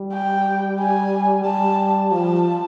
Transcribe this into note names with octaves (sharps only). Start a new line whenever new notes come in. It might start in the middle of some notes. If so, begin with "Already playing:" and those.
Already playing: G3
G5
G#5
G3 A5
F3 A5